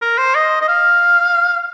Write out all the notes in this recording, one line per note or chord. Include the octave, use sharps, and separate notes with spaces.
A#4
C5
D#5
D#5
F5